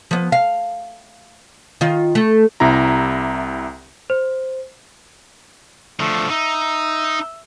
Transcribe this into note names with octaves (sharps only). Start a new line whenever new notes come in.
F3 B3
F5
D#3 F4
A3
C2 C3 E4 A#5
C5
D3 F3 A3
D#4 E5